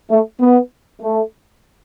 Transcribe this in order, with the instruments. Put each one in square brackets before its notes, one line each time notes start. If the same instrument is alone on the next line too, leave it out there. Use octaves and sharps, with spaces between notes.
[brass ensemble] A3
B3
A3